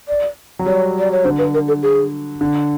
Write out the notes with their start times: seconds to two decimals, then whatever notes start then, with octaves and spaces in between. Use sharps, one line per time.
0.08 D5
0.59 F#3
0.66 G3 C#5
0.99 D5
1.12 C#5
1.25 D3 C5
1.39 B4
1.54 A#4
1.68 A4
1.83 G#4
2.41 D3